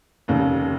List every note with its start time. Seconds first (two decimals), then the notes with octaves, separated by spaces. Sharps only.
0.28 F1 D#2 C#3